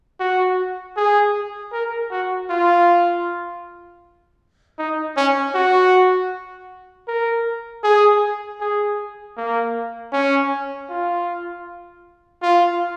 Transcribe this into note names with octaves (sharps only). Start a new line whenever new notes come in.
F#4
G#4
A#4
F#4
F4
D#4
C#4
F#4
A#4
G#4
G#4
A#3
C#4
F4
F4